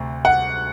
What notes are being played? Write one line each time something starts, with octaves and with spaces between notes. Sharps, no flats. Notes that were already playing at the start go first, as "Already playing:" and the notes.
Already playing: D2 C3
F#5